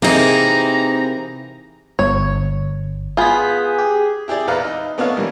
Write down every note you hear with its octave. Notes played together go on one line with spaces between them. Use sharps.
C3 E3 A#3 C4 D#4 G#4 A#5
G1 C#5
B3 F4 G#4 G6 B6
G4
E4 G4 G#4 D5
E2 E4 B4 F5 A#5
D#4
A3 B3 D4 D#4 C#5 F5
E3 G3 A#3